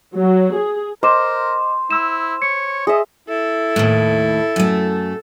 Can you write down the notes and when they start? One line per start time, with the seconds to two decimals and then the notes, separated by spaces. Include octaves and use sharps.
0.16 F#3
0.56 G#4
1.03 A#4 C5 D#5 D6 E7
1.91 E4 C6 E6 E7
2.42 C#5 C#7
2.87 G#4 D#5 E5
3.29 E4 A4
3.76 D#2 A2
4.56 F#2 A3